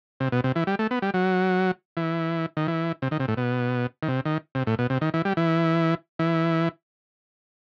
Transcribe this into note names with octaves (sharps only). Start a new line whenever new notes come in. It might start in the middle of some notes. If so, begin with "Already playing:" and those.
C3
B2
C3
E3
G3
A3
B3
G3
F#3
E3
D#3
E3
C3
D#3
C3
A2
B2
D#3
C3
D#3
C3
A2
B2
C3
D#3
E3
G3
E3
E3